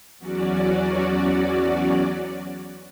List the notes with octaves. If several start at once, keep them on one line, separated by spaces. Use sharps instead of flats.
E2 F#3 C#4 F#4 D5